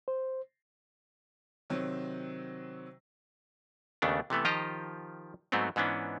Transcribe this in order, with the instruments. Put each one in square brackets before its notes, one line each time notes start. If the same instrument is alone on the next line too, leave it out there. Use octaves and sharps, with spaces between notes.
[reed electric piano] C5
[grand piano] C3 D#3 F#3 C4
[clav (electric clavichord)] D#2 C#3 A3 B3 D4
C3 E3 A3 B3
D#3 F3 F4 G4 D#5 A#5
G#2 F#3 A3 B3 C4
G#2 E3 B3 C#4 D4